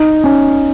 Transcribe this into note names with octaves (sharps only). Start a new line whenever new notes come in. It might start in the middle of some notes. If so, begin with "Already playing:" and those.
Already playing: D#4
C#4